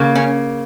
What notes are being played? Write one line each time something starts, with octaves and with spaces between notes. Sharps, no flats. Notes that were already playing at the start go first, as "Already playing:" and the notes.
Already playing: C#3 A#3
C#4